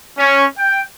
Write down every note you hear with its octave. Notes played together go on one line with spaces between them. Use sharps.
C#4
G5